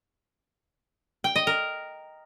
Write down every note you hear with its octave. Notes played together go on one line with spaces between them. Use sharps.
G5
D#5
A#4